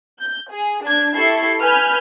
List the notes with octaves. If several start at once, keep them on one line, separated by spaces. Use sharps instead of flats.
G6
G#4
D4 G#6
E4 G4 A4 C#6 G#6 C7
B4 G#5 B5 F6 G6 G#6